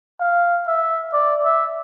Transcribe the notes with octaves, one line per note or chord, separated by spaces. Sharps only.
F5
E5
D5
E5